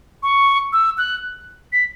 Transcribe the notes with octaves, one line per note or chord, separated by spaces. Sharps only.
C#6
E6
F#6
B6